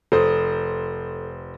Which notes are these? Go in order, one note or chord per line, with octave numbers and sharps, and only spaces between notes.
F1 A4 C5 D#6